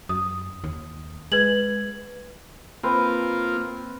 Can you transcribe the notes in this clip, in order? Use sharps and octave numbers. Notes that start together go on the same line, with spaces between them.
F#2 D#6
D#2
G#3 B4 G#6 F#7
A#3 C4 F4 B4